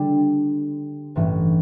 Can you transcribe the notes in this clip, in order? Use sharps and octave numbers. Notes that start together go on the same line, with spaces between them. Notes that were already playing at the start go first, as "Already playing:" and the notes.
Already playing: D3 G3 D4 G4
A1 G2 E3 A3 C#4